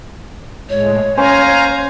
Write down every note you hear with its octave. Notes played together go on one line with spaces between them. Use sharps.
A2 G#3 C#5
C#4 C5 F5 G#5 A#5